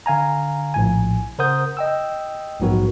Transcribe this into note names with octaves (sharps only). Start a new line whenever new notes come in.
D3 F5 G#5 A#5
A#1 A2 G#5
C#3 A#4 C5 F#5 D#6 G6
D#5 G5 E6
A#1 G#2 F#3 B3 F#4 A#4